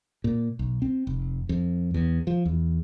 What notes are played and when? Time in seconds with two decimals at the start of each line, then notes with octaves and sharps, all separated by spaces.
0.24 A#2
0.59 B1
0.82 C4
1.07 F1
1.49 F2
1.94 E2
2.27 F3
2.45 E2